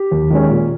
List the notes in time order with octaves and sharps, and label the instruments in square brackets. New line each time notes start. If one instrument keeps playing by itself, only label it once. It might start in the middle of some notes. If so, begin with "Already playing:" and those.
Already playing: [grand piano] G4
D#2
D#3 G#3 C#4
A#2